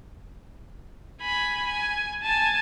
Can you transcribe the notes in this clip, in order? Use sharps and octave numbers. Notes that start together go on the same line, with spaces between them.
G#5 B5
G#5
G#5 A5